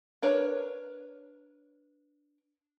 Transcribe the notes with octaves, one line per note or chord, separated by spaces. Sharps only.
D4 A#4 B4 C#5